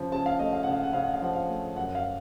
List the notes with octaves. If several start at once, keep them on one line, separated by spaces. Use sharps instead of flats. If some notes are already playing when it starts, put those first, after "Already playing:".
Already playing: C#3 F3
C#3 A5
F5
A3 D#5
F5
C#3 F#5
F5
F#5
C#3 F5
F#5
F5
F3 F#5
F5
A3
F#2 F#5
F5